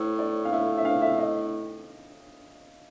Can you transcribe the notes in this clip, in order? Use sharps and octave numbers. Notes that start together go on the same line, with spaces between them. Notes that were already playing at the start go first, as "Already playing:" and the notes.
Already playing: A2 C#5
D5
F5
A2 E5
E5
F5
E5
D#5